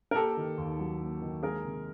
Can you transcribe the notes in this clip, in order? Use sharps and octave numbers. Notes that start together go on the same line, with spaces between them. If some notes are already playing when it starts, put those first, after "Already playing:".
A#4
A#3 G4 A4
D#3
D#2
F#3
A#3
D#3
G#3 G#4 A#4
C3